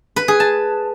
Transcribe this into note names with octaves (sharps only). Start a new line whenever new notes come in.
B4
G#4
A5